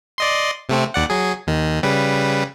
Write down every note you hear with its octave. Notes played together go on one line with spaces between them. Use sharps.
D5 D#5 C6
C3 A3 C4
D#2 D5 F#5
F#3 G#4
D#2 D#3
C#3 G3 B4